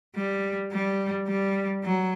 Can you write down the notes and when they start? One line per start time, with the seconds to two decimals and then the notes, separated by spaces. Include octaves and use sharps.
0.16 G3
0.72 G3
1.28 G3
1.84 F#3